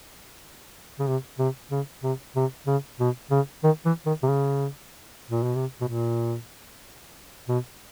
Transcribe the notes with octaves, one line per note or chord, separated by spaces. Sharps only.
C#3
C3
C3
C#3
C3
C3
C#3
B2
C#3
D#3
E3
D#3
C3
C#3
A#2
B2
C3
B2
A#2
B2